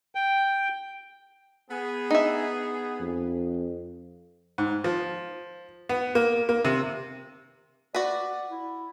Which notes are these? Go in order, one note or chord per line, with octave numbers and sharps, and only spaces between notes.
G5
B3 G#4
D#4 E5
F2
G#2
F3
B3
A#3
A#3
C3
F#4 B4 D5
E4